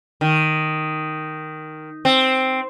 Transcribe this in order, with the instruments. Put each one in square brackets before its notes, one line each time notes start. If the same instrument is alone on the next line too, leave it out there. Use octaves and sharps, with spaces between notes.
[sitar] D#3
C4